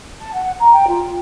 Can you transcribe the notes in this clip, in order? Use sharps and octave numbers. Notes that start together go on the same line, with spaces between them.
A5
F#5
A#5
G5
F4